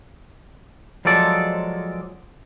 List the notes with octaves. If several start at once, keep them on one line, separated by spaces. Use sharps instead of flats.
F3 F#3 G#3 A4 D5